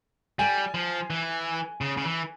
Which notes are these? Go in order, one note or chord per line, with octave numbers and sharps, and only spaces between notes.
G3 G#5
F3
E3
C#3
C#3
E3